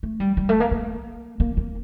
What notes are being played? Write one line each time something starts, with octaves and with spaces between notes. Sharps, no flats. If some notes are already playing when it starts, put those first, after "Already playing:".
A3
G3
G3
A3
A#3
A#3
A#3
A#3